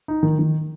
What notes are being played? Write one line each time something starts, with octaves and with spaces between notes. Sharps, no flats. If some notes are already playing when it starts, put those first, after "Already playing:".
D#4
D#3
D#3